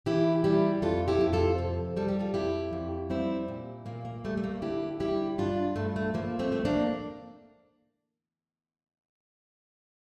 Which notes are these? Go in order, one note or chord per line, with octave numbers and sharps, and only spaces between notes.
E3 E4 G4
G3 E4 G4
F2 F4 A4
E4 G4
F2
F4 A4
C3
G3 A4
G4
F4 A4
F2 E4 G4
F2
G3 C4 E4
A#2
A#2 A#3
A#3
G3 A3
A3
A#3
D3 E4 G4
G3 E4 G4
G2 D4 F4
G2 A3
A3
F3 A#3
A3 C4
A3
A#3 D4